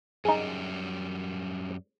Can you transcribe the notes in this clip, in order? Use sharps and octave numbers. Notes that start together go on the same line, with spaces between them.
F#2 G3 D#4 G#4